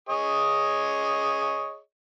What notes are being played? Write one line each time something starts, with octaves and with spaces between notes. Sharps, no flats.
G#4 C#5 D#5